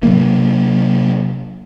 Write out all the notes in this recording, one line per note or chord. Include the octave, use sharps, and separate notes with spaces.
C3 F#3 A#3